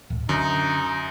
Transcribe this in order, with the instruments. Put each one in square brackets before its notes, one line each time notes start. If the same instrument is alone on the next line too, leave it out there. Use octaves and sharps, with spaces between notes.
[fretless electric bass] D1
[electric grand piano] F#2 [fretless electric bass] D3 [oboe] D#4